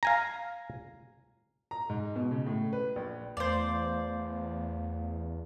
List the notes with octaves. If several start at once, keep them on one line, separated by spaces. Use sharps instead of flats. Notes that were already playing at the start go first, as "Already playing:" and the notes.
F5 G#5 A#5
A#5
G#2
B2
C#3
A2
B4
A#1
E2 A3 C5 D5 F5